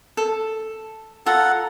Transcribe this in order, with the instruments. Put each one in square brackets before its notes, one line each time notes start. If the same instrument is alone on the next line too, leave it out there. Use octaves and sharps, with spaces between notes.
[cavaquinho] A4
[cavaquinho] F4 A#5 [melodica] A4 F#5